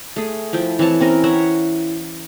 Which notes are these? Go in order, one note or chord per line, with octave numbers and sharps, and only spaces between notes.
A3 G#4
F3 E4 G5
E3 C4 C#5 A5
C4 C#4 A#4
A#4 C#5 E5 F#5